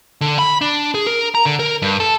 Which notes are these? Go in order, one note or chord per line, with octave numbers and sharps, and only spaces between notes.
D3
B5
D4
G#4
A#4
A#5
D3
A#4
G2
A4